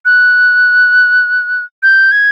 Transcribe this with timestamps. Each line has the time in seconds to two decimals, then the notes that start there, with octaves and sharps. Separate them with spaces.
0.05 F#6
1.83 G6
2.12 G#6